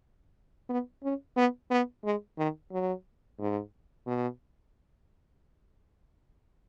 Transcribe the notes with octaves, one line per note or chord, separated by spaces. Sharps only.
B3
C#4
B3
B3
G#3
D#3
F#3
G#2
B2